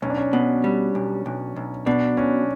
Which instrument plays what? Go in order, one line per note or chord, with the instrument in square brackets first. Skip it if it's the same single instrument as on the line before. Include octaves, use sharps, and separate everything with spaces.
[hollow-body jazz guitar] B1 [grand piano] C#4
[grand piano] D4
C#4
[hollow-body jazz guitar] B2
G3
B1
B1
B1
[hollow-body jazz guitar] B2 [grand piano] D4
[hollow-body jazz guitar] B1 [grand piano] C#4